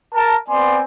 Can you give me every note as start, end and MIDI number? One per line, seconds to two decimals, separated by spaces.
0.13 0.34 70
0.13 0.34 81
0.48 0.80 59
0.48 0.80 60
0.48 0.80 74
0.48 0.80 80
0.48 0.80 84